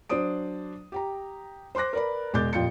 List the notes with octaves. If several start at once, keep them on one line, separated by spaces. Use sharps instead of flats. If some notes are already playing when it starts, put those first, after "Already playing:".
F#3 D4 C5 D5 D#6 D7
G4 G5 A#5
C5 C6 D6 F#6 A#6
A#4 B4 D5 A#5 B5
E1 G#3 D6 G6 A6
D#1 F2 F4 G6 C#7